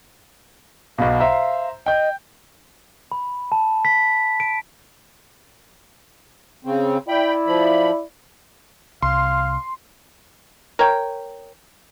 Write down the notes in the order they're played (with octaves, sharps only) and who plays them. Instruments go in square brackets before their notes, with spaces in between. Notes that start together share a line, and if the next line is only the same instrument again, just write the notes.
[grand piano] B1 B2 [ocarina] F5
[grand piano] C5 E5 A#5
[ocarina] D#5 [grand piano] G5 G6
[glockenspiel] B5
A5
B6
D7
[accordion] C#3 C4
[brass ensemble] E4 D5 [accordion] G5 B5
[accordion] F3 B5
[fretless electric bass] C2 [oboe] F5 [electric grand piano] C6
[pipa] A#4 C#5 G5